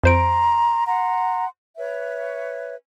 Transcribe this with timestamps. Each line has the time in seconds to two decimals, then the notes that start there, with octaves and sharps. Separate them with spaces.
0.04 F2 C5 A#5 C6 D7
0.87 F#5 A#5 C6
1.77 B4 C#5 E5